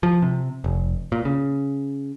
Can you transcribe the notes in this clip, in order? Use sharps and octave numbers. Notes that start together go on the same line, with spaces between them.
F3
C3
F1
A#2
C#3